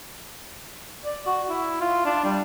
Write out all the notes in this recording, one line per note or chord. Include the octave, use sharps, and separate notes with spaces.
D5
F#4
E4
F4
D4
G3